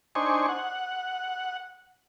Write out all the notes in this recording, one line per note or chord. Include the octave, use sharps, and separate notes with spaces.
D4 D#4 C5 G#5 C#6
F#5